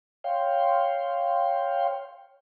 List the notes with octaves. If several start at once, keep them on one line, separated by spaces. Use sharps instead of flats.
C#5 F5 G5 C6